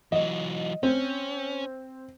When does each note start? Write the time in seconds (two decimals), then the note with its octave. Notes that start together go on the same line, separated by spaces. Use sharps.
0.12 E3 F#3 D#5
0.83 C4 C#4